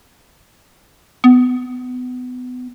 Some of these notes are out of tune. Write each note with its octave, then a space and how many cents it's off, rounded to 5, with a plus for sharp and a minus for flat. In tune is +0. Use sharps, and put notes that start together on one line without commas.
B3 +25